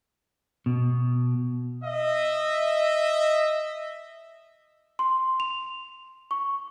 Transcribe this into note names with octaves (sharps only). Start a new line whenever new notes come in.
B2
D#5 E5
C6
F7
C#6